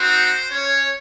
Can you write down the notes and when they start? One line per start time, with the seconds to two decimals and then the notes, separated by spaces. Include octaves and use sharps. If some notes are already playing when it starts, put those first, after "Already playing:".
Already playing: C4 D#4 F#4 C5
0.51 C#4 C#5